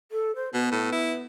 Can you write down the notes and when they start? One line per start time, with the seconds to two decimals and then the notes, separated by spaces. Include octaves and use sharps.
0.12 A4
0.35 C5
0.54 B2 B3
0.72 A2
0.92 E4